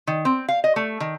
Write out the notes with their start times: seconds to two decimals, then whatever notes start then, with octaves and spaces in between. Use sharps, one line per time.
0.07 D#3
0.25 C4
0.48 F5
0.64 D#5
0.76 A3
1.00 D#3